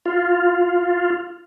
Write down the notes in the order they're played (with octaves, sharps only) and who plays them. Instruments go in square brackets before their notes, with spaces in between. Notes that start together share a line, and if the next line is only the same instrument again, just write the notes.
[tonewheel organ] F4